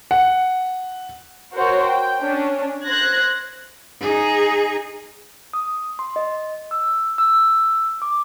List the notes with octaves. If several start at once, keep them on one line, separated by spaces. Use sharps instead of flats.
F#5
F#4 A#4 C5 C#5
G5
C#4 D4
C5 F#6 G#6 A#6
D#4 G#4
D#6
C6
D#5
E6
E6
D6